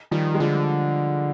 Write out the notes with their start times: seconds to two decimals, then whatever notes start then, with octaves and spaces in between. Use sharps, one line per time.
0.11 D#3 F3 G3
0.35 G#3
0.40 D3 F3 G3